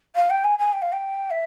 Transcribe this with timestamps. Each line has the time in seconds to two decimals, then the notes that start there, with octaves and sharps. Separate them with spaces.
0.16 F5
0.30 G5
0.44 G#5
0.59 G#5
0.73 G5
0.82 F5
0.92 G5
1.31 E5